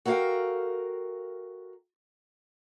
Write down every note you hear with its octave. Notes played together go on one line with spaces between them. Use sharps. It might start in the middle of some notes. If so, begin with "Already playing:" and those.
F#4 A4 A#4 C#5 F5 G5